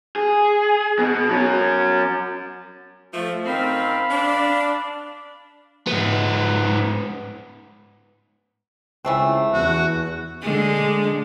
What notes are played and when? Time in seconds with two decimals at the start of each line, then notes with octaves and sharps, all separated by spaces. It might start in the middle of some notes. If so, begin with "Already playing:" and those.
0.16 G#4
0.99 B2 B3
1.29 F#3 C#4
3.14 F3 A3
3.46 F#2 D#3 C4 F5 B5
4.10 D4
5.87 G#2 B3
9.05 C#2 E3 A3 C4
9.54 E2 F#4
10.42 D3 G#3